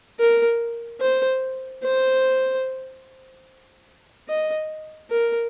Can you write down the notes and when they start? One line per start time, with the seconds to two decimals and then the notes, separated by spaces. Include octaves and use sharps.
0.20 A#4
1.01 C5
1.83 C5
4.28 D#5
5.10 A#4